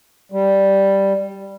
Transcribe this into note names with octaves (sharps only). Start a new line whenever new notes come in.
G3